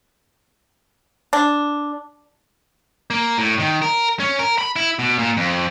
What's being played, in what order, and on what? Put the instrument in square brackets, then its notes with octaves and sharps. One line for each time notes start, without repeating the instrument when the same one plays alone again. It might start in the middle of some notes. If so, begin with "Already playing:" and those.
[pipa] D4
[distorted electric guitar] A#3
A2
D#3
A#4
C#4
A#4
B5
E4
B2
A#2
F2